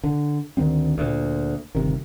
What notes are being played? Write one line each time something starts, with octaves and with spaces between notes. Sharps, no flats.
D3
D2 D#3 B3 C4
D2 A#2
G1 C3 D#3